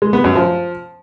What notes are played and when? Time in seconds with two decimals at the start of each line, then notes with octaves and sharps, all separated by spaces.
0.02 G#3
0.13 B3
0.24 F#2
0.35 F3